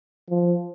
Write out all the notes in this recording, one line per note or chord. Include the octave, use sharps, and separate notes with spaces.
F3